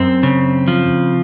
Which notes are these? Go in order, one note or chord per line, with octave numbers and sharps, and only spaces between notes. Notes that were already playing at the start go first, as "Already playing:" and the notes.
Already playing: F#2 C4
C#3
F3